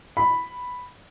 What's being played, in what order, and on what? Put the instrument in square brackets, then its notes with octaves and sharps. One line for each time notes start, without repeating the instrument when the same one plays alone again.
[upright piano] B5